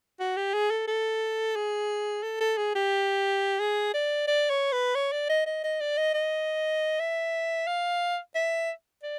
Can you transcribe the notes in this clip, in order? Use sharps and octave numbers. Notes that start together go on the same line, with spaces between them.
F#4
G4
G#4
A4
A4
G#4
A4
A4
G#4
G4
G#4
D5
D5
C#5
B4
C#5
D5
D#5
D#5
D#5
D5
D#5
D#5
E5
F5
E5
D5